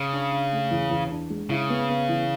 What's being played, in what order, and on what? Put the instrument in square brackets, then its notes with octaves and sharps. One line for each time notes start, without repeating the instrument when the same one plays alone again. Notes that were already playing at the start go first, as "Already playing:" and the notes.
Already playing: [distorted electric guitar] C#3
[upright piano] D4
D4
A3
E2
E2
D4
G#3
[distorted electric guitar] C#3 [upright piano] E4
[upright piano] B3
B3
E3